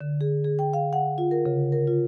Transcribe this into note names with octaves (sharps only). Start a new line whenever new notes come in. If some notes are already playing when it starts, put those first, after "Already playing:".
D3
G#4
G#4
G5
F5
F#5
F4
A#4
C#3
A#4
F4